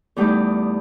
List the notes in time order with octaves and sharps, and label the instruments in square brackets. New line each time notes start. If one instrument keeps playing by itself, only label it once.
[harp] E2 G3 A3 D#4 G4 D6